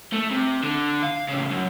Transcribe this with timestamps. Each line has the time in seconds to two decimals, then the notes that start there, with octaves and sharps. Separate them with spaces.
0.13 A3
0.31 C3
0.64 D3
1.03 F5
1.29 A2 C#3
1.51 F#2